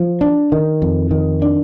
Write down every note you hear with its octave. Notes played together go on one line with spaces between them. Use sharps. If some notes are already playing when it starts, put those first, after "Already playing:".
Already playing: F3
D4
D#3
F2
D#3
D4